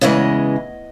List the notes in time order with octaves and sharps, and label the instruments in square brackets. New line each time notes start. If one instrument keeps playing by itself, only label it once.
[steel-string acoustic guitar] E2 C#3 E3 G#3 D#5